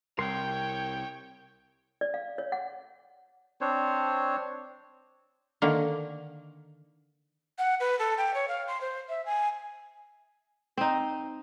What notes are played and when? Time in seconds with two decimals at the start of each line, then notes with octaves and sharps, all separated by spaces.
0.19 C2 A#4 C#5 G5 C6
2.01 D5
2.14 F5
2.38 C#5
2.52 F#5
3.61 C4 D4 C5 C#5
5.62 D3 D#3 A#3
7.58 F#5
7.80 B4
7.99 A4
8.18 G5
8.34 C#5
8.48 F5
8.68 C6
8.81 C5
9.09 E5
9.26 G#5
10.77 C4 D#4